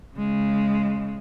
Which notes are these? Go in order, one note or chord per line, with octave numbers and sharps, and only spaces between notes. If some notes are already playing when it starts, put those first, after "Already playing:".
C#3 G#3